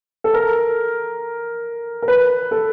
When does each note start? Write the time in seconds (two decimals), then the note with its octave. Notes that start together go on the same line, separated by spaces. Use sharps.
0.24 A4
0.34 A#4
2.02 A#4
2.08 B4
2.51 A4